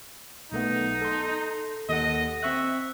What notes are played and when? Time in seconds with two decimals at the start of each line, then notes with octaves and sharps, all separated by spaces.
0.52 B1 A3 B3 D#4
1.02 A4 C6
1.89 D#2 A4 D#5 F#5
2.43 C4 E5 C#6 F#6